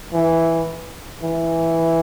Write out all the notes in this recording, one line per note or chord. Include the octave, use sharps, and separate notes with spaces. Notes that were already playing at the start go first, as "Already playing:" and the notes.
E3
E3